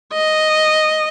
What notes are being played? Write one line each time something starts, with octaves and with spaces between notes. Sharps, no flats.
D#5